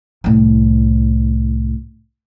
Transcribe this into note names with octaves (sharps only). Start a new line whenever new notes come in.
C2 A2